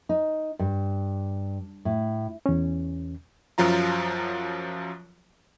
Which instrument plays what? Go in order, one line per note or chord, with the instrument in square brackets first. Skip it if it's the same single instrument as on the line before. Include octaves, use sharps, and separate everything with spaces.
[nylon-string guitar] D#4
G2
A2
[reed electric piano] E2 C#4
[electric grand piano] F#2 F3 F#3 F4 A#5